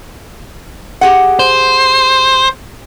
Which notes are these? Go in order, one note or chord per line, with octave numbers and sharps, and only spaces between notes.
G4 G#4 F#5
C5